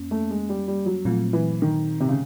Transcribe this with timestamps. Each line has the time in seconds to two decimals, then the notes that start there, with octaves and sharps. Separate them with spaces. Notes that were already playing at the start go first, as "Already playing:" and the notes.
Already playing: F2 A#3 C#4
0.11 A3
0.30 G#3
0.49 G3
0.68 G3
0.86 F#3
1.05 A#2 F3 F#3 A3 C4
1.33 E3
1.62 D#3
2.00 C3
2.09 C#3